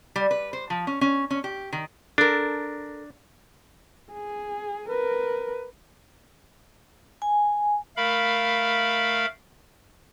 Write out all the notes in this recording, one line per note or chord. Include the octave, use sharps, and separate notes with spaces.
G3
B4
C5
F3
C#4
C#4
C#4
G4
D#3
D4 A4 A#4
G#4
A#4 B4
G#5
A3 A#4 F5 B5